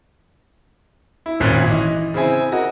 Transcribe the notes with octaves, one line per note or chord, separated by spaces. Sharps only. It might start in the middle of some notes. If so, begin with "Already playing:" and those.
E4
G#1 A#2 C#4 F#6
E3 D#5
C#3 C4 E4 G#5
F#4 A#4 D#5